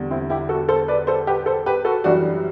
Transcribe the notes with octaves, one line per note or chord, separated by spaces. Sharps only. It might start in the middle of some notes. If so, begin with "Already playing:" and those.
Already playing: E2 D3 G3
C4 E4
E4 G4
F#4 A4
A4 C5
B4 D5
A4 C5
G4 B4
A4 C5
G4 B4
F#4 A4
F#2 E3 G3 D4 F#4